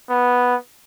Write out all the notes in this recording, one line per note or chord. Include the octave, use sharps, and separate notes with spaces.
B3